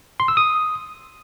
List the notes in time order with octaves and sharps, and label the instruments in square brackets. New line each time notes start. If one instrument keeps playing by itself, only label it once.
[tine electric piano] C6
E6
D#6